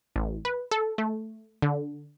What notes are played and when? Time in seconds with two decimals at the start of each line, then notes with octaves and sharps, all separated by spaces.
0.16 A1
0.45 B4
0.71 A4
0.98 A3
1.62 D3